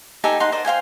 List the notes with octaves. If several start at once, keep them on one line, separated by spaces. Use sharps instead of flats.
D#4 G4 A4 G#5
D#4 F#5 C6
A#4 C5 D5 D#5
C5 F5 G5 G#5